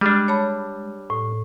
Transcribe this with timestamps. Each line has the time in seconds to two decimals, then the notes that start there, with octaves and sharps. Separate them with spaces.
0.01 G3 G#3 D4 F6
0.28 C#5 A5 B5
1.10 A2